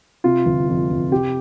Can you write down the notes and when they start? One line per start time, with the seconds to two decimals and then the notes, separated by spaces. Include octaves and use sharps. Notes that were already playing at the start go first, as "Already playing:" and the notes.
0.24 C3 F4
0.46 G1
0.68 F2
0.89 G1
1.11 C3 G4